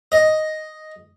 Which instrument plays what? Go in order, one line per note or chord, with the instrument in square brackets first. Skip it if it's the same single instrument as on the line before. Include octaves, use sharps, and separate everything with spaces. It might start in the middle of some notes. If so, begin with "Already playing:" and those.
[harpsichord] D#5